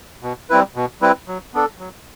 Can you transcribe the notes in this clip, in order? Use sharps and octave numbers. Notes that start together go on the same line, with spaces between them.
B2
G3 C4 E4 B4
B2
G3 C4 E4 B4
F#3
B3 D4 A4
F#3